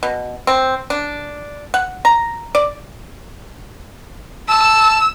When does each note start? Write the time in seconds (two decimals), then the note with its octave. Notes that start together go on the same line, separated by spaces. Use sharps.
0.03 B2
0.47 C4
0.90 D4
1.74 F#5
2.05 A#5
2.55 D5
4.48 A5 E6